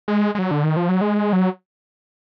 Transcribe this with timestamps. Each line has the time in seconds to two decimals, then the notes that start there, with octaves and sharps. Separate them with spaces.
0.08 G#3
0.35 G#3
0.39 F#3
0.51 D3
0.64 D#3
0.77 F3
0.89 F#3
1.01 G#3
1.33 F#3